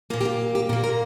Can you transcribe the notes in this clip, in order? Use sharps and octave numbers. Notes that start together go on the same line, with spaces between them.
A#2 A#3 F4
G4
F4
G4
A#2 A#3 A#4
A#4